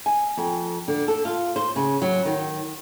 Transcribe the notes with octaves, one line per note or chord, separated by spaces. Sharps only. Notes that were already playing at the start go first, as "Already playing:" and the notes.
G#5
F2
D3
A4
F4
C5
C#3
F#3
D#3